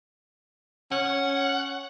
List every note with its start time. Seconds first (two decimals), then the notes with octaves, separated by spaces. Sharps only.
0.92 C#4 F#5